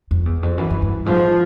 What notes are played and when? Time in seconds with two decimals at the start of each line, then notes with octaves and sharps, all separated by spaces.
0.11 F2
0.26 E2
0.43 F2
0.58 F#2 E3
0.70 F#2
0.82 G2
1.06 G#2 F3